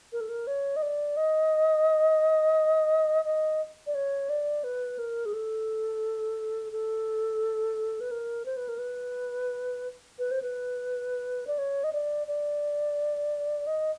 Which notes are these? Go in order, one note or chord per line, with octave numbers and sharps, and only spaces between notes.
A#4
A4
A#4
C#5
D#5
D5
D#5
D#5
D5
C#5
D5
B4
A#4
G#4
A4
A4
B4
A#4
C5
B4
A#4
B4
B4
C5
B4
D5
C#5
D#5
D5
D5
D#5